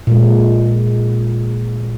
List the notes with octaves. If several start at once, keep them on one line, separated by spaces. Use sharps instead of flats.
A#2 G#3